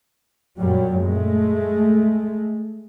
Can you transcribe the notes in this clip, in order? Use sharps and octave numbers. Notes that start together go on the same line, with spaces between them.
F#2 A#2 F#3 G3
G#3 A3